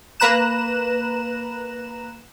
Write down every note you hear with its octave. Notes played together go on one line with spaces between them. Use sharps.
A#3 B4 A#5 F#6 E7